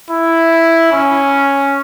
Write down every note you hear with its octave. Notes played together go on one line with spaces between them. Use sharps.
E4
C#4